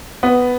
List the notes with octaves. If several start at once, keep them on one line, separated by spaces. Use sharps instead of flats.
B3